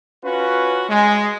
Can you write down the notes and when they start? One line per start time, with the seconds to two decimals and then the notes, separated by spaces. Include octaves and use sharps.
0.23 C#4 F4 F#4 B4
0.89 G#3